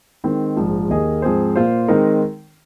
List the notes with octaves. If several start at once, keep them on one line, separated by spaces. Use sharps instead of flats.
D#3 G#3 C4 D#4
A#1 G#2 F3
D#2 D#3 A#3 G#4 D#5
G#2 F3 C4 G#4 C5
A#2 A#3 F4 C5
D#3 G#3 C4 D#4 A#4